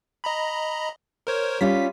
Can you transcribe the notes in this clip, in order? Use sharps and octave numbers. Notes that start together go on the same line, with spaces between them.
D#5 A#5 B5
A#4 C5 C#5
G3 C#4 F4 B6